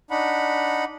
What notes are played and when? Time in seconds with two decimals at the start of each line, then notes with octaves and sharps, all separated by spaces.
0.11 D4 D#4 F#5 B5